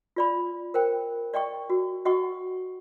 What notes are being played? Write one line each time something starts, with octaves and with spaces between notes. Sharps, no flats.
F4 D5 B5
A#4 C5 G5
D5 D#5 G5 C#6
F#4
F#4 D#5 F#5 C#6